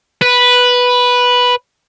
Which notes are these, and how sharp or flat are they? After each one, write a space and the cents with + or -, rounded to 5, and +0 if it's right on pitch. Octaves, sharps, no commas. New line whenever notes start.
B4 -5